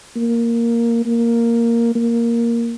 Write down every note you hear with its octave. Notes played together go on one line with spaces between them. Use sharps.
A#3
A#3
A#3